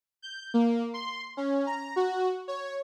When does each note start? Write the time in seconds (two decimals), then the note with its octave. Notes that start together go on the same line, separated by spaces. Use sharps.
0.22 G6
0.54 A#3
0.94 C6
1.37 C#4
1.66 A#5
1.96 F#4
2.48 C#5